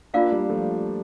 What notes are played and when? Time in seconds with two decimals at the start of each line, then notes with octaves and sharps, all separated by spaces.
0.14 A#3 D4 F4 A#4 D5 F5
0.32 G3 A#3
0.49 F3 A3